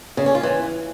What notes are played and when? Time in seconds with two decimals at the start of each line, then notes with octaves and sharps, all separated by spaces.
0.17 C#3
0.26 C#4
0.35 F4
0.43 E3